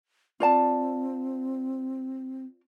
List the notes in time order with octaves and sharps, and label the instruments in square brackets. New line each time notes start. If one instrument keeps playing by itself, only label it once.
[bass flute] C4 [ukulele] F4 D5 A5